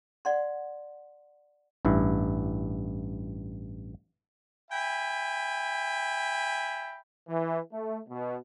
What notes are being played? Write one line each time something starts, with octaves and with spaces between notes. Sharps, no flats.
D5 F#5 C6
A1 G2 E4
E5 G5 G#5 B5
E3
A3
B2